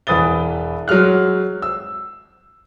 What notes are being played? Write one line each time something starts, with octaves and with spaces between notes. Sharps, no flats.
E1 E3 B4 D#6 A6 G7
F#3 G#3 F6 F#6
E6